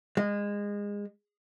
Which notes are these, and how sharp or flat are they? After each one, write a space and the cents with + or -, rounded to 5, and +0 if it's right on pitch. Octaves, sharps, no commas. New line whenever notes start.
G#3 -25